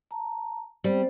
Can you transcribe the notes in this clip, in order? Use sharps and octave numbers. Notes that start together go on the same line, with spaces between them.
A5 A#5
G3 B3 C4 C5